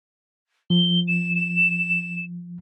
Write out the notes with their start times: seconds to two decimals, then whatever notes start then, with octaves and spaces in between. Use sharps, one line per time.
0.70 F3 G7
1.08 E7
1.35 E7